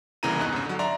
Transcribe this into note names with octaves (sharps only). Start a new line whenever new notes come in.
C2 C#3 E3 A#3 A#5 D#7
E2 G2 D#4 F#6
G#2 C#3
D3 F#3
D5 E5 A#5 C6